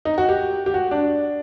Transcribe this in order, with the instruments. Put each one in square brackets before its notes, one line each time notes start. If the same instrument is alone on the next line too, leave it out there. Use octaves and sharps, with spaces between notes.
[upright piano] D#4
F#4
G4
G4
F#4
D4